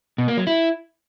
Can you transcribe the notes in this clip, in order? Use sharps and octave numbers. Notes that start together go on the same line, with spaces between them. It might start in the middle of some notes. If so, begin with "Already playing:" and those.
B2
A#3
F#3
E4